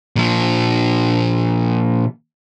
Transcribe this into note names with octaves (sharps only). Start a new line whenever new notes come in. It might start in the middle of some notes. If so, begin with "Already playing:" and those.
A#2 F3